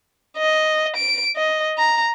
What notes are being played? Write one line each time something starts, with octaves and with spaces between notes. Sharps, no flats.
D#5
D7
D#5
A#5